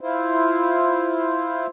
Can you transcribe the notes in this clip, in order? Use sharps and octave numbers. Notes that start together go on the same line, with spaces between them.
E4 F4 C5